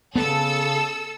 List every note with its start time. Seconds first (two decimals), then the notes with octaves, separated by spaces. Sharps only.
0.16 C#3 B3 A4 E6